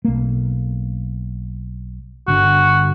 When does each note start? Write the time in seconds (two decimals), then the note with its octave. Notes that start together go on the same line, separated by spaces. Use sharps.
0.04 B1 A#3
2.28 G1 D3 F#4